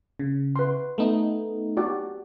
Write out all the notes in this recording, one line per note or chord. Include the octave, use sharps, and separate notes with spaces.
C#3
B4 C6
A3 B3 D#4
F#4 G4 D5